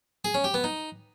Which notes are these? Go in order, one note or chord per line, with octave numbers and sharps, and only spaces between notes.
G#4
C#4
G4
B3
D#4